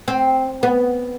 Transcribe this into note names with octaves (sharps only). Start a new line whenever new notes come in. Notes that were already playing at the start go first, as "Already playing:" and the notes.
C4
B3